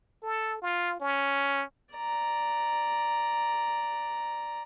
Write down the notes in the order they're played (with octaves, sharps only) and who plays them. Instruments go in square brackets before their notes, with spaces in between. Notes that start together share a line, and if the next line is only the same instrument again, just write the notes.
[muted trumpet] A4
F4
C#4
[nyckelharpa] D5 A#5